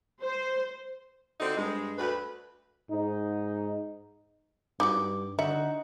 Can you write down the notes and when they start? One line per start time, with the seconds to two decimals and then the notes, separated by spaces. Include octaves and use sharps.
0.22 C5
1.40 D3 C4 D#4 F4 F#4
1.56 G2 G#3
1.98 D2 B4
2.91 G#2 D#4
4.80 G2 D#4 E4 F#4 D6
5.39 D3 D#4 F#4 E5